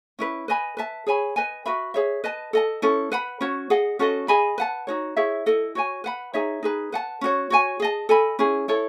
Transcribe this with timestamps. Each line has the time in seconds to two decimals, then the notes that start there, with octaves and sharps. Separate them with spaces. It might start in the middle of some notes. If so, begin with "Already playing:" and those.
0.19 C#4 E4 B4
0.48 B4 D#5 G#5 B5
0.77 B4 E5 A5
1.07 G#4 C#5 G#5 B5
1.36 B4 D#5 G#5
1.65 F#4 B4 E5 B5
1.94 G#4 C#5 E5
2.24 B4 D#5 A5
2.53 A4 D#5 A5
2.82 C#4 E4 A4
3.12 B4 F#5 B5
3.41 C#4 F#4 C#5
3.70 G#4 D#5 F#5
3.99 C#4 F#4 A4 D#5
4.28 G#4 D#5 G#5 B5
4.58 B4 F#5 A5
4.87 D#4 F#4 C#5
5.16 E4 G#4 C#5 E5
5.46 E4 A4 D#5
5.75 F#4 C#5 G#5
6.04 B4 F#5 B5
6.34 D#4 G#4 C#5 E5
6.63 D#4 G#4 B4
6.92 B4 F#5 A5
7.21 C#4 F#4 C#5
7.50 F#4 C#5 G#5
7.80 G#4 D#5 A5
8.09 A4 D#5 G#5 B5
8.39 C#4 E4 G#4
8.68 E4 A4 C#5